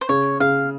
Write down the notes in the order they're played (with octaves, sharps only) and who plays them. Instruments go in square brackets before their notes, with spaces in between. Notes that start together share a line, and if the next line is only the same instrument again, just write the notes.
[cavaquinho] C5
[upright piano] C#3 [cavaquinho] C#5
[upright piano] C#3 [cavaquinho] F5